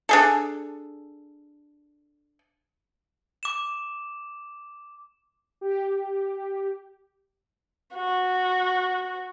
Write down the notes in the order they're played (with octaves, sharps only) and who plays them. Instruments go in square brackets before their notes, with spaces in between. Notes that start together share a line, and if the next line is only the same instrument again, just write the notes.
[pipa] D4 G#4 A4
[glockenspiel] D6 E7
[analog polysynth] G4
[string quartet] F#4